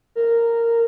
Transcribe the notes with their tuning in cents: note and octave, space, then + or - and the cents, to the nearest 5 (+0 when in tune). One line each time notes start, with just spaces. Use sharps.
A#4 -10